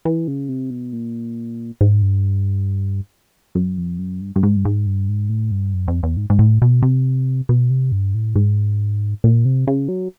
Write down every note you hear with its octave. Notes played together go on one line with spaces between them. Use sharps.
E3
C#3
C3
B2
A#2
G#2
G2
F#2
F2
F#2
G2
G2
G#2
G2
G#2
G2
G#2
A2
G2
F#2
F2
E2
G#2
G#2
A2
B2
C3
B2
C3
G2
A2
G#2
A#2
C3
C#3
F#3